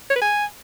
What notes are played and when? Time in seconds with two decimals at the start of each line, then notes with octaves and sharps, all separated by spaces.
0.10 C#5
0.16 B4
0.21 G#5